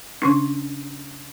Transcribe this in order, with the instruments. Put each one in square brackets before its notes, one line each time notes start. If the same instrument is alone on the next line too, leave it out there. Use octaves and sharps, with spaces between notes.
[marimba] C#3 C#4 D4